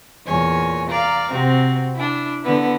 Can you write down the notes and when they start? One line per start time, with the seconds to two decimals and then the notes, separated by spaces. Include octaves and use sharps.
0.26 E2 A#2 C#5 G#5
0.89 D5 F5 A#5
1.30 C3 C4 F#4
1.94 D4 E4
2.42 D3 B3 E4